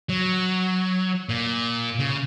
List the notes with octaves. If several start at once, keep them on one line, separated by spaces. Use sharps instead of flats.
F#3
A#2
C#3